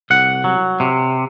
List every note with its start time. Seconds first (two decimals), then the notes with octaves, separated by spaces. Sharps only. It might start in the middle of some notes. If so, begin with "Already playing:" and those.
0.10 C2 F#5
0.44 F#3
0.80 C3